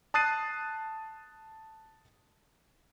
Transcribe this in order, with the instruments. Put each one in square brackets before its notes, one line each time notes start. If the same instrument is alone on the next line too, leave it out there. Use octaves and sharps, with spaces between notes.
[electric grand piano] A5 D#6 F#6 A6 C7 D#7